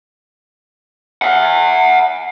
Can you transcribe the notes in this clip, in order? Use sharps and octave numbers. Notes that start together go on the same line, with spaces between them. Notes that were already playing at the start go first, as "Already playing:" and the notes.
E5 F#5